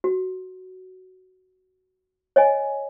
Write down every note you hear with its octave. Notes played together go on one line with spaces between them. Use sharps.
F#4
C#5 D#5 G#5